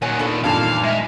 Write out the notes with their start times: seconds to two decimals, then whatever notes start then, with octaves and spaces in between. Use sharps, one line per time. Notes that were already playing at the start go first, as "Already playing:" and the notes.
0.02 A#2 D#3 F#3 C#5 F#5 G#5
0.19 B3 D4 F4 A4
0.44 E2 G2 A#2 D#3 F5 A5
0.83 G#3 E5